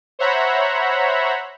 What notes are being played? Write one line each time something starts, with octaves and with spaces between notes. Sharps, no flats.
C5 C#5 E5 F#5 A#5 B5